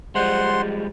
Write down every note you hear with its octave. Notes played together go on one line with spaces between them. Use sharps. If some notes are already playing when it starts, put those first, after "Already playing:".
F3 G3 G#3 C5 F#5 C6